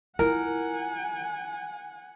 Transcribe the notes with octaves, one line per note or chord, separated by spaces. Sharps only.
E4 F4 A#4 F#5 G#5